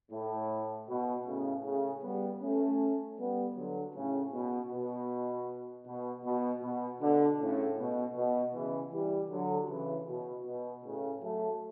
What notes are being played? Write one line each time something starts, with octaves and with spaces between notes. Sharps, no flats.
A2
B2
A2 C#3
A2 C#3
G3 B3
A3 C#4
G3 B3
D3 F#3
A2 C#3
B2
B2
B2
B2
B2
B2 D3
A2 C#3
B2
B2
C#3 E3
E3 G3
D3 F#3
C#3 E3
B2
B2
A2 C#3
F#3 A3